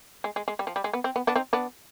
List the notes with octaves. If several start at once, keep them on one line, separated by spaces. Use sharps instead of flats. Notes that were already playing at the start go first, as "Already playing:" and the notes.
G#3
G#3
G#3
G3
F3
G3
G#3
B3
C4
B3
B3 D4
C4 D#4
B3 D4